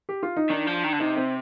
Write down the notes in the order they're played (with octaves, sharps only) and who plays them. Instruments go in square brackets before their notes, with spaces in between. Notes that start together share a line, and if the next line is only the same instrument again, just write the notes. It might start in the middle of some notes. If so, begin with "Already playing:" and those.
[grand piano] G4
F4
D#4
[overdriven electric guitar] D#3 [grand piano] D4
[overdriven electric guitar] F3
D#3
D3
[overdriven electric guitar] C3 [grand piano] D#4
[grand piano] C4